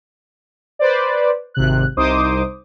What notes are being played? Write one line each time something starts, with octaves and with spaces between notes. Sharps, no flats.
B4 C5 D5
G#1 C3 F#6
C2 D#4 C5 D6 D#6